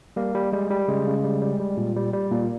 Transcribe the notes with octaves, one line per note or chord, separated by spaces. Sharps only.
G3 A#3
G3
G3 G#3
G3
C#3 G#3
C#3
G3
G3
G3
A#2
G3
G3
A#2 A#3